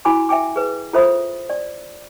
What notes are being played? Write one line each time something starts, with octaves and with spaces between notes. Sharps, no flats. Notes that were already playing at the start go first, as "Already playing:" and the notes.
E4 F#4 G#5 B5 D6
E5 G5 G#5 D6
G#4 B4
F4 A4 C5 E5 B5 D#6
D5